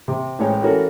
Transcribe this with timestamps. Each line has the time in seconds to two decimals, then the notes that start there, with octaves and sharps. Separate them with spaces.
0.08 C3
0.39 A1 G#3 C#5 G5
0.62 E3 C#4 F#4 A4 A#4